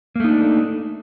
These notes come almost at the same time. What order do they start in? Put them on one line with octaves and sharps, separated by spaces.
A#3 A3 D#4 D4